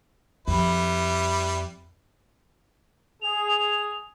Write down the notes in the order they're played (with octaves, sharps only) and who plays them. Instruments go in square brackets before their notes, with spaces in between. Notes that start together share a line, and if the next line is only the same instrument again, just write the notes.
[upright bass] F2 [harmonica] G3 E4 B4
[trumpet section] G#4 [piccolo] F7